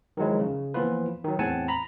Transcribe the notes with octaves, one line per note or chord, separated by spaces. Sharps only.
D#3 F3 F#3 G#3 E4
C#3
E3 F3 A#3 B3 F4 B4
D#3 F#3
E2 A2 C4 F#5 G#5 A5
A#5 B5